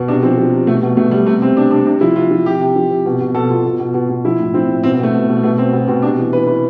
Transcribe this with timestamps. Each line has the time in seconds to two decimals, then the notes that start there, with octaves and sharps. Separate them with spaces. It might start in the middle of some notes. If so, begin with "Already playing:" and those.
Already playing: B2
0.08 C3 D4
0.23 F3 C4
0.38 F3
0.52 C3
0.67 B2 A3
0.83 B2
0.97 B2 A3
1.11 B2 G3
1.26 C3 A3
1.41 C3 C4
1.56 C3 D4
1.71 C3 D4
1.87 C3 D4
2.01 F3 E4
2.16 C3 F4
2.31 F3
2.46 C3 G4
2.61 C3
2.76 F3
2.91 C3
3.06 B2
3.21 B2
3.35 B2 A4
3.50 B2 F4
3.65 B2
3.80 B2
3.94 B2
4.09 B2
4.25 F3 E4
4.40 A2
4.54 F3 C4
4.69 A2
4.83 B2 C4
4.94 B3
4.99 B2 A3
5.14 B2
5.28 B2
5.43 B2 A3
5.58 B2 C4
5.73 B2 B3
5.88 B2 C4
6.02 C3 D4
6.18 E3
6.33 E3 B4
6.47 E3 B4